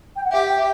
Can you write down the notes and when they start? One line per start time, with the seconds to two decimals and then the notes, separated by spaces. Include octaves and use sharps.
0.16 G5
0.24 F#5
0.32 G4 E5
0.57 E5